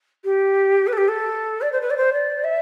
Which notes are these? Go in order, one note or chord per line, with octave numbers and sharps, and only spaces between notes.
G4
B4
A4
G4
A4
D5
C5
B4
D5
C5
D5
E5